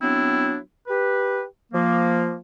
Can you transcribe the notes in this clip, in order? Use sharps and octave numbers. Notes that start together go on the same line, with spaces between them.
F#3 B3 C4 D4 E4
G4 B4
F3 A#3